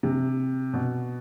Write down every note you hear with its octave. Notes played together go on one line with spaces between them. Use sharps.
C3
B2